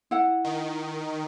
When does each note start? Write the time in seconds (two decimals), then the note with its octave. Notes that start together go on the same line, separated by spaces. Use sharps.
0.11 E4 F#5
0.44 D#3